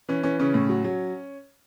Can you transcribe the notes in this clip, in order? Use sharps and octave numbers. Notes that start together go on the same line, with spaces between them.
E3 C#4
E3 C#4
C#3 C#4
A2
F#3
F#3